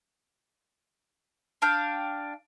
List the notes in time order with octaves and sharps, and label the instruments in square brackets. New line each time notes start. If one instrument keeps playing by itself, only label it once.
[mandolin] D4 F5 G5